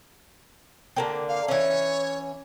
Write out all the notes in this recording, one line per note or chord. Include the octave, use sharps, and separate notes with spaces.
D3 A#3 C4
F5
E3 C#4 C#5